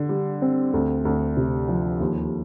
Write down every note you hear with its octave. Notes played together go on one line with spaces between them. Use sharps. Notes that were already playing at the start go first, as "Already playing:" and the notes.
Already playing: D3
G3
C4
D2
D2
C3
F3
D#2